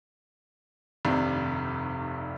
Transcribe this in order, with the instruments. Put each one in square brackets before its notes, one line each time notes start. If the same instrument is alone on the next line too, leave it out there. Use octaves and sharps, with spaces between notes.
[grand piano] F1 G2 C3 D#3